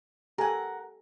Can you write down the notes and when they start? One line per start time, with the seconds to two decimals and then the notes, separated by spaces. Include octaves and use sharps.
0.38 G4 A4 A#4 F#5 G#5